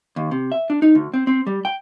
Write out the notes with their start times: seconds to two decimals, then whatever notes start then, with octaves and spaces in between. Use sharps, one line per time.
0.16 D#2
0.31 C3
0.52 E5
0.70 D4
0.82 D#4
0.95 D2
1.14 C4
1.27 C4
1.47 G3
1.65 G5